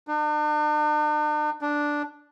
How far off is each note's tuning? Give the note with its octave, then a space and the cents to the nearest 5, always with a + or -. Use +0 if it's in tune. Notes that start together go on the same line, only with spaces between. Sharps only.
D4 +45
D4 +0